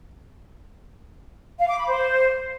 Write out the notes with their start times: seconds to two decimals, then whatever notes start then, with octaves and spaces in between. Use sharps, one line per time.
1.59 F5
1.68 D6
1.78 B5
1.87 C5